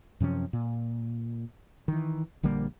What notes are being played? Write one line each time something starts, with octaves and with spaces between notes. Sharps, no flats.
F#2 C3 F3 C#4
A#2
D#3 E3
A#1 D3 G3 A#3